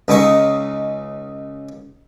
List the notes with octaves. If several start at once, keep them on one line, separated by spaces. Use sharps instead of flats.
C#2 C#3 D#4 F5 C#6